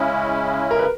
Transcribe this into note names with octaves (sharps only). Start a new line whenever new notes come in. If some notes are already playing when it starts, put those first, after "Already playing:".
Already playing: C#3 G#3 C#4 E4
A#4
B4